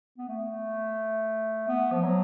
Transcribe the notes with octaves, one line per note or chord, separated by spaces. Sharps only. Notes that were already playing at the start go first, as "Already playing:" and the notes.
B3
A3
B3
F3
F#3